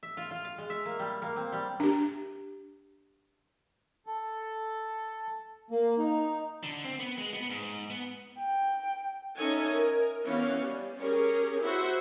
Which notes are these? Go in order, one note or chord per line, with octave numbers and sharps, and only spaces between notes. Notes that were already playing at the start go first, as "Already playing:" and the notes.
E5
F4
F4
F5
G#3
E5
A#3
G3
A#3
C4
G3
D4 G4
A4
A#3
D#4
D3
C4
B3
G#3
B3
G#2
B3
G5
C#4 D#4 A4 E5 G#5
A#4
E3 B3 C#4 G4 F5
G3
C#4 G4 G#4 A#4
E4 F#4 C5 E5 F#5